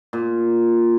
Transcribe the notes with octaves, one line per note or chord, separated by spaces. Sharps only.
A#2